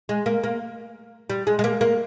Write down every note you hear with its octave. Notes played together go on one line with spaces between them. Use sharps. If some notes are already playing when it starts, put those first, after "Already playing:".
G#3
A#3
A#3
G3
G#3
G#3
A#3
A#3